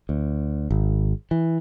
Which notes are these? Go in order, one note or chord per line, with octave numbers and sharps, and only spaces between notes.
D2
G#1
E3